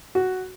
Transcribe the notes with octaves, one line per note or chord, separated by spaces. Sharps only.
F#4